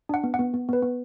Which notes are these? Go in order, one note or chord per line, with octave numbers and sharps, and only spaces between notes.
D4 F#5
B3
F#5
B3
B3
B3 B4
B3